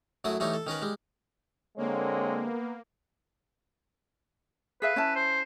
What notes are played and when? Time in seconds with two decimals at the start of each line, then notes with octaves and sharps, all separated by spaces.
0.24 F#2 F#3 A3 E4 D#6
0.40 E3 G3 A3 D#4 C#5
0.53 A4
0.67 D#3 C#4 A#4 B4
0.82 G3 G#3
1.78 D3 G#3 A#3 C4 C#5
2.42 B3
4.82 G#4 B4 E5 F5
4.96 C#4 E4 A5
5.16 C5